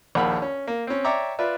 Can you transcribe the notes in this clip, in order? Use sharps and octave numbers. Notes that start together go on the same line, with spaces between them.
A#1 D#2 A#4 F#5 B5
C#4
A#3
C4 C#4
C#5 D5 E5 G5 A#5 D6
F4 B4 D5 E5